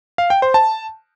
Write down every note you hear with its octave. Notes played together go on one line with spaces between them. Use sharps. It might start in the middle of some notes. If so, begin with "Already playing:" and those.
F5
G5
C5
A5